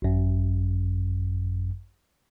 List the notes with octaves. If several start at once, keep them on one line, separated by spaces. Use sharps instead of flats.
G#1 F#2